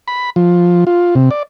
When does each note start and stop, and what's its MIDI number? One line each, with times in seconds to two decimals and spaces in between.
0.08 0.30 83
0.36 0.84 53
0.87 1.15 65
1.15 1.30 48
1.31 1.43 74